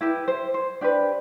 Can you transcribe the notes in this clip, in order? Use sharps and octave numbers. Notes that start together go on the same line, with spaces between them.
E4 G4 B4
C5
C5
D4 G4 B4